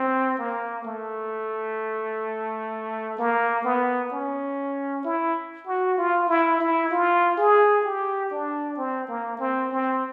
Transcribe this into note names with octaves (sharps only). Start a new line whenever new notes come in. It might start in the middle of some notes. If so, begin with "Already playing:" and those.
Already playing: C4
A#3
A3
A#3
B3
C#4
E4
F#4
F4
E4
E4
F4
G#4
G4
D4
C4
A#3
C4
C4